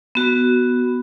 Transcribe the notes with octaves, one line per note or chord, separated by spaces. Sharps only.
B3 F#4